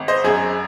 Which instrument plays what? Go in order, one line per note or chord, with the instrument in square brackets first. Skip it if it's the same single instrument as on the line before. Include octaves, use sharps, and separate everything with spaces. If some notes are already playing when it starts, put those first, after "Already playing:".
Already playing: [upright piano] G#1
C5 D#5
F#2 G#4